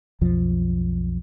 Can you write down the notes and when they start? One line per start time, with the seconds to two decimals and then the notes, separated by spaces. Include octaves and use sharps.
0.21 B1 F2 F3